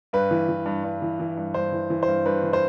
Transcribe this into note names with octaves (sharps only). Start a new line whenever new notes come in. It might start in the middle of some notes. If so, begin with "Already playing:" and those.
G2 B4
E3
E3
G2
G2
E3
E3
G2
G2 C5
E3
E3
C5
G2
G2 B4
E3
C5